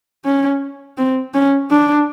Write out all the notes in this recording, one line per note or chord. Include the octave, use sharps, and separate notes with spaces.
C#4
C4
C#4
D4